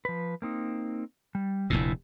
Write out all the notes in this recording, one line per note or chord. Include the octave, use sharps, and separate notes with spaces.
F3 B4
A#3 C4 D#4
G3
F1 D2 A#2 E4